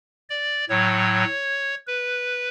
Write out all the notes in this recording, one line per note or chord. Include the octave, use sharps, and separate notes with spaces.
D5
A2 F#3 C#5
B4